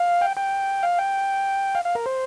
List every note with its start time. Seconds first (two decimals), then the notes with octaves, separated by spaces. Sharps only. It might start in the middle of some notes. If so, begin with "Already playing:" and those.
Already playing: F5
0.21 G5
0.37 G5
0.83 F5
0.98 G5
1.75 F5
1.85 F5
1.95 A#4
2.06 C5